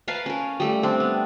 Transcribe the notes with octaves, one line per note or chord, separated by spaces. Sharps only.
A#4 B4 F5 A5
C#4 A#4
G3 A3
C4 D4
B3